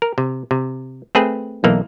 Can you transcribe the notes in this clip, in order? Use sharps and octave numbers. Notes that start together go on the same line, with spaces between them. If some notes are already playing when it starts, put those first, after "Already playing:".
A#4
C3
C3
A3 C4 G#4 B4
B1 E3 A#3